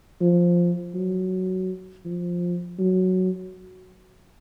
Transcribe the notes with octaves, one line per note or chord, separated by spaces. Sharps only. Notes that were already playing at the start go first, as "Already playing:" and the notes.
F3
F#3
F3
F#3